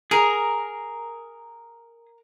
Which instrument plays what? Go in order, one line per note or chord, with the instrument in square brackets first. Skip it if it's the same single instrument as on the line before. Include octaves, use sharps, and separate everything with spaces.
[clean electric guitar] G#4 [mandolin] A#4